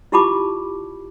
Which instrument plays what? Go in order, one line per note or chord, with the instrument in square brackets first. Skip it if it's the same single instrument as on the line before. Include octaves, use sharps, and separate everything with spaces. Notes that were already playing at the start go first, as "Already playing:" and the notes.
[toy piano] E4 F4 G4 A5 B5 D6